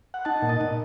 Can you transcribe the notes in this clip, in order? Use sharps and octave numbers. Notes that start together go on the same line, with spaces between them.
F#5
D#4 A5
A#2
D#5
A#2